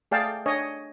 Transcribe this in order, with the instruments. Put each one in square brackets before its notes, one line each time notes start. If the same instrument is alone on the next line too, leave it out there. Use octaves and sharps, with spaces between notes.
[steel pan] A3 G#4 D5 F5 G5 A5
D4 C#5 D#5 G#5